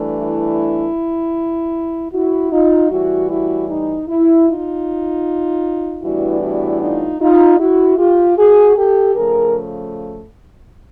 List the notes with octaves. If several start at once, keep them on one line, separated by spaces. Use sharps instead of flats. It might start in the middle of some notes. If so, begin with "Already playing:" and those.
Already playing: G2 E3 A3 D4
E4
E4 F#4
D#4 F4
A2 E3 G3 E4 F#4
E4 F#4
D#4
E4
D#4 F4
A2 E3 G3 B3 D4 E4 F#4
E4 F#4
D#4 F4
D#4 F4
E4 F#4
F4 G4
F#4 G#4
G4 A4
C#3 F3 A3 G#4 A#4